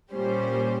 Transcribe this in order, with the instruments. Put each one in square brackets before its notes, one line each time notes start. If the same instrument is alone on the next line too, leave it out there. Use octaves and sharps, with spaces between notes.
[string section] A#2 G3 C#4 G4 C5